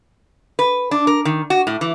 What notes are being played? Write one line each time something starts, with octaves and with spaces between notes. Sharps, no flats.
B4
D4
A#4
D#3
F#4
A2
E3